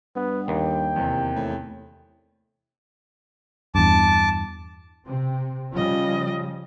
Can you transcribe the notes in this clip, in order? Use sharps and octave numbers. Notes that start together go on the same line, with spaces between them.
G2 B3
D#2 G5
E2 C3
A2
E2 G2 A5 D6
C3 C4
C#3 F3 G3 F4 D#5